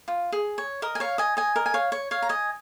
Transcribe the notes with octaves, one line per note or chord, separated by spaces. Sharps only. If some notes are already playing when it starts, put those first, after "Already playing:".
F4
G#4
C#5
A#4 D#5
G#5
C#5 F5
D#5 G#5
D#5 G#5
A#4 D#5
G#5
C#5 F5
C#5
C#5 F5
A#5
D#5 G#5